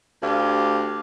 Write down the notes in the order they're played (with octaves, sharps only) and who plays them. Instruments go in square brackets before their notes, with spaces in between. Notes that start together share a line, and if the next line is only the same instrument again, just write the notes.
[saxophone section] D2 G4 F5